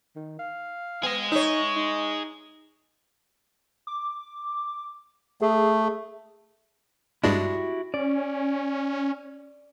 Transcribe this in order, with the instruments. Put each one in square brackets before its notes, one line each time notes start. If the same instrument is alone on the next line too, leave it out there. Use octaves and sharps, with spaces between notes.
[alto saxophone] D#3
F5
[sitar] B3 [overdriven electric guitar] G#4 D#5
[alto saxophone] D#4 [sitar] C#5 E5
[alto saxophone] D#4
[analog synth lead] D6
[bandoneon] A3 [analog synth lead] G#4
[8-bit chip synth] G2 G#3 D4 [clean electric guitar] E4 F#4 G4
[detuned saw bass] C#4 [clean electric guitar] D5